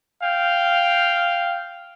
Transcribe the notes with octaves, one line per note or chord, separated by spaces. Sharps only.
F5 G5